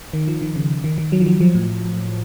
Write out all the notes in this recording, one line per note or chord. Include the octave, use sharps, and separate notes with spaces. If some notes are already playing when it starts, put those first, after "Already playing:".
D#3
F3
D#3
C#3
D#3
D#3
F#3
F3
F#3
F3
A2